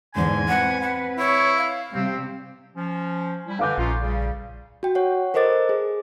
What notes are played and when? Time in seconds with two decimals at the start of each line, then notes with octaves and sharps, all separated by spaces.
0.15 E2 G#2 D3 G#5 C6
0.48 C4 B4 F#5
0.81 F#5
1.18 E4 C#5
1.57 F5
1.94 C3 G3 C4 G4
2.75 F3 C#4
3.47 G3 E4
3.59 D3 E3 F5 D6 G6
3.78 A#1 C#4 D#4 F4
4.01 C#3 G3
4.83 F#4 G5
4.95 C#5 F#5
5.34 A4 A#4 C5 D#5 D6 A6
5.69 G#4